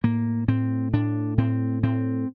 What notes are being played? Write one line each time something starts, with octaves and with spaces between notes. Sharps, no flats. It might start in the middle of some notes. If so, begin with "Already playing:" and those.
A2 A#3
A2 C4
A2 D4
A2 C4
A2 C4